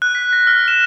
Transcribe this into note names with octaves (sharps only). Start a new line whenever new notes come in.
F#6
B6
A#6
F6
E7